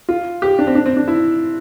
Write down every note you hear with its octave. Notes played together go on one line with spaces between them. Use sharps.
F4
G4
D4
C4
D4
C4
D4
E4